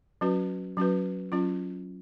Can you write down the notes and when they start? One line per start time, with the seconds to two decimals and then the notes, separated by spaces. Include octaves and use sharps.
0.21 F#3 C#4 F#4 B4
0.77 F#3 C#4 F#4 B4
1.32 F#3 C#4 F4